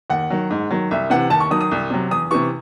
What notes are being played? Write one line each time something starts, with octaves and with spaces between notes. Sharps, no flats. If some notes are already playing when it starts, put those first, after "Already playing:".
D#2 F#5
D#3 F#3
G#2
D#3 F#3
C2 E5
C3 E3 F#5
D#2 A5
C#6
D#3 F#3 D#6
D#6
C2
C3 F#3
E2 D#6
C3 E3 C#6